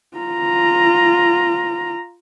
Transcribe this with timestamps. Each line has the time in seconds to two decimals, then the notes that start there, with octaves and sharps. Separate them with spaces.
0.17 F4 A#5